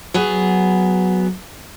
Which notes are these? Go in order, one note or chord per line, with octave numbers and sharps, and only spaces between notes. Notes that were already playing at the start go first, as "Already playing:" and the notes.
F#3 B3 G#4